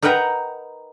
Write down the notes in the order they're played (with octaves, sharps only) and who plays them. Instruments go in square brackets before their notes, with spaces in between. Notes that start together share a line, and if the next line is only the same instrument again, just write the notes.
[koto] D#4 A#4 B4 F#5 G5 A#5